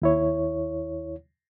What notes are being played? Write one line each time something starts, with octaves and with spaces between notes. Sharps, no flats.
D#2 E4 C#5